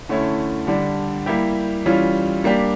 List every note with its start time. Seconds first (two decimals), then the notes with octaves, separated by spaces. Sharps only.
0.09 D3 A3 C#4 E4
0.67 D3 G3 D4
1.26 G3 A#3 E4 G4
1.86 E3 G3 C#4 F4
2.44 G3 A#3 D4 G4